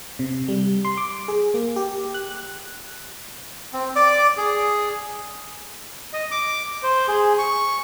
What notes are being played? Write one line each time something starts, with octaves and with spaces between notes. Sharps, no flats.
C3
G3
C6
D6
G#4
A#3
G4
F#6
C4
D5 D6
G#4
D#5
D6
C5
G#4
C#6